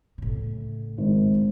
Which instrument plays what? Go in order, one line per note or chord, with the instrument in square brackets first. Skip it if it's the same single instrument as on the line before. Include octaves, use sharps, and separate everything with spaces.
[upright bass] A2 C#3
[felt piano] G#1
[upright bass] A1